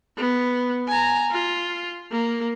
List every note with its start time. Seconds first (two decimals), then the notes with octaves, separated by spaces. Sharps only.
0.17 B3
0.88 G#5 A#5
1.31 F4
2.11 A#3